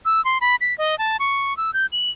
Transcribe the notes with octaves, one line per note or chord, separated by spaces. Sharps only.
E6
C6
B5
B6
D#5
A5
C#6
E6
G6
F#7